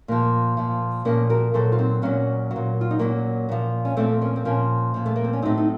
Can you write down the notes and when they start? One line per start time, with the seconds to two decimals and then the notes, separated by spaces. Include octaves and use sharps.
0.08 A#2 F3 A#3
0.57 A#2 F3
1.05 A#2 F3 A#3 C#4
1.30 F#4 A#4
1.54 A#2 F#3 A4 C5
1.72 F4
1.79 C4 D#4
2.02 A#2 F#3 A#3 C#4
2.51 F#3
2.56 A#2
2.81 F4
2.91 D#4
2.99 A#2 F#3 A#3 C#4
3.49 A#2 F3
3.85 C#4
3.97 A#2 F3 A3 C4
4.21 A#3 C#4
4.36 C4
4.45 A#2 F3 A#3 C#4
4.94 A#2 F3
5.06 A3
5.16 A#3
5.24 C4
5.33 C#4
5.42 A2 F#3 C4 D#4
5.58 D#4